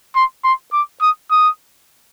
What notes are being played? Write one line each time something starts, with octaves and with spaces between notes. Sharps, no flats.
C6
C6
D6
D#6
D#6